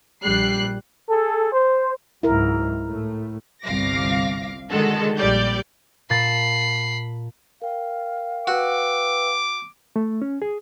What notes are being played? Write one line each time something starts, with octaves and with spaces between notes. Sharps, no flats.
A#1 G3 F#6 C7
G#4 A4
C5
C#2 G#2 F#3 E4 A#4
A2 A3
G1 C2 F5 D6 A#6
D3 D#3 G#3 F#4 A4
A#1 G3 G4 D5 G6
A#2 A5 B5 A6 C7
A#4 F5 G5
F#4 B4 G5 D6 E6
A3
C#4
G#4